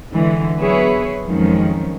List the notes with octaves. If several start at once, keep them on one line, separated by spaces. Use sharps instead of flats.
D3 E3 G#3
F#3 B3 G#4 B4 C#5 E5
F2 D#3 F3 F#3 G#3 C#4